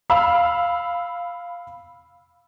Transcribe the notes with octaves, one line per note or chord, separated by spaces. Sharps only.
F5 B5 E6